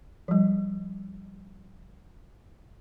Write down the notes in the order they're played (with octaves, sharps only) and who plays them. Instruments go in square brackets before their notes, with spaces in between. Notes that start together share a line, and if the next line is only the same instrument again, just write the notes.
[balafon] F3 G3